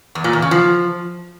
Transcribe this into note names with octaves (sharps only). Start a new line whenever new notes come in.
E2
A#2
E2
C#3
F3